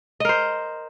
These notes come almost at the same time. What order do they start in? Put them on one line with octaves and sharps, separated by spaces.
D#5 A#4 C5